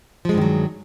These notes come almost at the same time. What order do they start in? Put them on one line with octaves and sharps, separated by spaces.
F3 G#3 G2 D#3 F#3